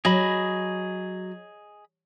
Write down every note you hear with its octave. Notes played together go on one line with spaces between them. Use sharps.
F#3 G#4 D#5 B5